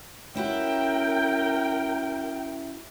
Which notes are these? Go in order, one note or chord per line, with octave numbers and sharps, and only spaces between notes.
C#4 E4 F#4 A#4 G5